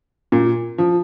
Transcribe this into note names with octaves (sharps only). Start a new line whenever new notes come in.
A#2
F3